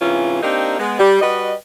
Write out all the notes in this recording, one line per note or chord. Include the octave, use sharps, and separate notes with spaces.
G#2 C3 E3 C#4 F4
A#3 C4 D4 D#4 G4 A#4
G#3 B3
G3
G3 F#4 B4 D#5